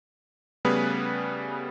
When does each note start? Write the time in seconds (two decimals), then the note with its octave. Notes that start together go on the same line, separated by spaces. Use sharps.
0.65 C#3 G3 A3 B3 G#4 B4